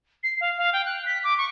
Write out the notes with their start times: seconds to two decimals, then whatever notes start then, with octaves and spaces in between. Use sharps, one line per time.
0.23 C7
0.41 F5
0.57 F5
0.73 G5
0.85 F#6
1.06 B6
1.24 D6
1.38 C#6